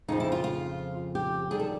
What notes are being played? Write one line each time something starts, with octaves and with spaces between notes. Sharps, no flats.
F2 C#3 F3 D#4
E4
F4
F4
G4
D#2 D3 G3 G#4
A4